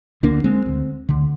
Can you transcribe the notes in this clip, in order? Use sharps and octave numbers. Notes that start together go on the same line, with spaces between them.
D2 D3 A#3 D4
G#3 C4
D2 D3
D2 D3